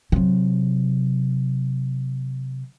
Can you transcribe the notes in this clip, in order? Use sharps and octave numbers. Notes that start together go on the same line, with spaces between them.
C3 F#3